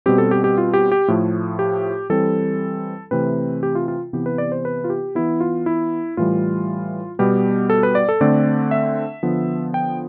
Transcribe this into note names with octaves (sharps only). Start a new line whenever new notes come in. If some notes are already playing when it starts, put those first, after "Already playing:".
B2 G3 C4 G4
A4
G4
G4
F4
G4
G4
A2 F3 A3
G4
E3 G3 C4 A4
C3 E3 A3 C4 B4
G4
F4
F4
C3 E3 B3 G4
B4
D5
C5
B4
F4
G4
E3 B3 E4
F4
E4
A2 E3 G3 F4
B2 G3 B3 G4
A4
B4
D5
A4
D3 A3 C4 D5
E5
D3 F3 B3
G5